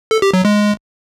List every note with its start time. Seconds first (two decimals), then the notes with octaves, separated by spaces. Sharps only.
0.11 A4
0.22 G4
0.33 F#3
0.45 G#3